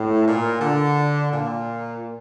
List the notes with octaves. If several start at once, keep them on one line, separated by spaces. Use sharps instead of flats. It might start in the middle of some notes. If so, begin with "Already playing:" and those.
Already playing: A2
A#2
D3
A#2